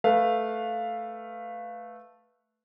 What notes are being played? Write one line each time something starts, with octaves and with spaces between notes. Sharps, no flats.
A3 B4 F5